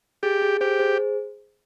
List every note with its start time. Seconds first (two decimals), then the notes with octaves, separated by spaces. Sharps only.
0.23 G4 G#4
0.42 G#4
0.61 G4 G#4 C5
0.79 G#4 C5